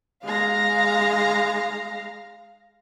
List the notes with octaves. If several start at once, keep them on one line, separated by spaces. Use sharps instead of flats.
G#3 F5 A#5